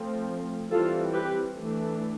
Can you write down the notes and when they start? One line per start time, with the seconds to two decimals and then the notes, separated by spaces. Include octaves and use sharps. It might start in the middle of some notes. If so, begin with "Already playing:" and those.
Already playing: F3 A3 C4
0.72 E3 G3 C4 F4 A4
1.13 G4 B4
1.56 E3 A3 D4